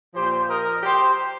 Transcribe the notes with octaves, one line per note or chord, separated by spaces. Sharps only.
A#2 F3 G4 C5
A#4 D#5
G4 C5